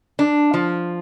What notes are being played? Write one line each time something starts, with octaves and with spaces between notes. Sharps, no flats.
D4
F3